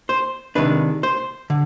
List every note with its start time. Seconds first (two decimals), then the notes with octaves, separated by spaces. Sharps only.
0.09 C5
0.55 C3 D#3 G#3 D4 B4
1.03 C5
1.50 D3